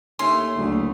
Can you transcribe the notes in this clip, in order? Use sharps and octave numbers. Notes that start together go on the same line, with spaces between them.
D#2 A3 C#4 C6
F#1 D2